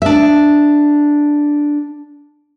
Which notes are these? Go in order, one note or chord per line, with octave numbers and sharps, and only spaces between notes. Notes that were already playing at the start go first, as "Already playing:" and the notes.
D4 E5